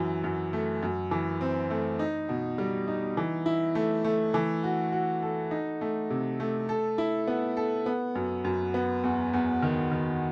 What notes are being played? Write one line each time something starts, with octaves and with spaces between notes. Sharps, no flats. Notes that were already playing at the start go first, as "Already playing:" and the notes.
Already playing: F#2 E3
F#2
A3
F#2
E3
C4
A3
D#4
B2
G3
D#4
E3
E4
A3
A3
E3
F#4
F#4
A4
D#4
A3
C3
A3
A4
E4
B3
A4
B3
F#2
F#2
B3
E2
E2
D#3
D#3